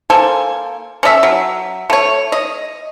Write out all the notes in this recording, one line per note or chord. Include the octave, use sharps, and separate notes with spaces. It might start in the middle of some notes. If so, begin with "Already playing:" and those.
A#3 A4 C5 G#5
C#4 A4 D5 E5
F#3
A3 C#5
D#5